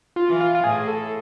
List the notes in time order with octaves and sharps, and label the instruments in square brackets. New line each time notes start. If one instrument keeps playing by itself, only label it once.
[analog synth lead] F4
[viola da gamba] E3
[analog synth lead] F4
F4
[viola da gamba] A2 [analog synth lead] G#4
[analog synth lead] A4